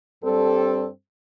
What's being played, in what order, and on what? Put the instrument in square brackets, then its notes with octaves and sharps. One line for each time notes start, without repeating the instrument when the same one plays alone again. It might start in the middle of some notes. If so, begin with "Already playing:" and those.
[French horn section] G2 G3 C4 A4